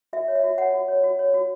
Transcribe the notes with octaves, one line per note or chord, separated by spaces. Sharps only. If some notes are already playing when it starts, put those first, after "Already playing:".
F#4 E5
C#5
E5
F#4
C#5 F#5
F#4
C#5
F#4
C#5
F#4